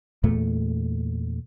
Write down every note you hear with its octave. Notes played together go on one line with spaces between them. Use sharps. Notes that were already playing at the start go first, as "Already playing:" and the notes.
E2 A#2 A3